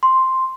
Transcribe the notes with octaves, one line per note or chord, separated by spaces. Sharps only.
C6